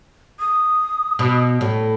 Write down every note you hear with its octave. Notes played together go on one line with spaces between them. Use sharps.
D#6
B2
A2